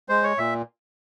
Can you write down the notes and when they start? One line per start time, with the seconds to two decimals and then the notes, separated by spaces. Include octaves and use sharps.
0.09 G#3 C5
0.23 C#5
0.38 A#2 E5